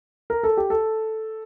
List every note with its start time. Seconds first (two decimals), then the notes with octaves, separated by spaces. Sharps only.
0.30 A#4
0.43 A4
0.57 G4
0.70 A4